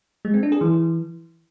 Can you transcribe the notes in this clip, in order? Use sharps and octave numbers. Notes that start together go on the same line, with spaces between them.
G#3
C4
D4
G#4
E3